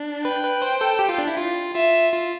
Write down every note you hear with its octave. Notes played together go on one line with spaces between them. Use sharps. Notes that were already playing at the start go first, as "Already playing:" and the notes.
Already playing: D4
B4 G5
B4
C5
A4
G4
F4
D4
E4
F4
F4 E5
F4